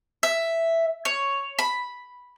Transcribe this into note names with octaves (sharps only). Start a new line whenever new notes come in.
E5
C#5
B5